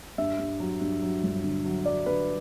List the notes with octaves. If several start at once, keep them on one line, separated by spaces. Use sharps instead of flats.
G2 E5
G2
F#3
G2
F#3
G1
D3
F#3
F#3 D5
D3 B4